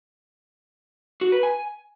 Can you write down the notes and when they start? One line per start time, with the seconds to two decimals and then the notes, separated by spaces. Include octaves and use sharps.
1.21 F#4
1.32 B4
1.43 G#5